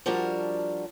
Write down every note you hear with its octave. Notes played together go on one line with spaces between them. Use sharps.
F3 G3 D4 F#4 A#4